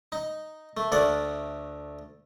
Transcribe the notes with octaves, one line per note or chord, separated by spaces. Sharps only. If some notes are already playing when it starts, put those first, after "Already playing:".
D#4
A3
D2 A3 D5 F#5